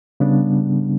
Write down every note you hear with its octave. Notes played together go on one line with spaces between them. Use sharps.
C#3 G3 B3 D4